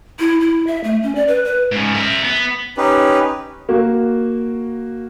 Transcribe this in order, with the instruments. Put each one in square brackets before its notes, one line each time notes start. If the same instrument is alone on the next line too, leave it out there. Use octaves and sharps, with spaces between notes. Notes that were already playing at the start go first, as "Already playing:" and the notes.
[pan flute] E4
E4
E5
A3
C#4
D5
B4
B4
[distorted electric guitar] G#2 C#3
A#4 E5
B3
[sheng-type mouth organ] C#4 D#4 G4 B4
[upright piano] A#3 F#4